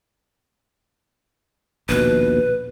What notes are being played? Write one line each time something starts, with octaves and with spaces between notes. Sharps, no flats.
A#1 D#2 B2 B4